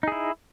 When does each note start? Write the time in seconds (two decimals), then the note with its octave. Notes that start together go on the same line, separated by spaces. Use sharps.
0.03 D#4
0.08 G#4
0.12 E4